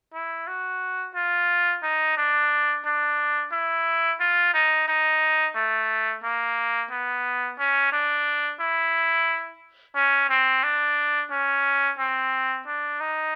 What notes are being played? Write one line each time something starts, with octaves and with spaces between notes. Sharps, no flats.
E4
F#4
F4
D#4
D4
D4
E4
F4
D#4
D#4
A3
A#3
B3
C#4
D4
E4
C#4
C4
D4
C#4
C4
D4
D#4